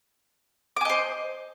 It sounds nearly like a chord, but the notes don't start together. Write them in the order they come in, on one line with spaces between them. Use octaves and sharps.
D6 G#5 D#5 C5